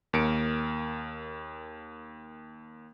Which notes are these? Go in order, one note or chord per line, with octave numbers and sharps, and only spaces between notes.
D#2 A#4 C#7 D7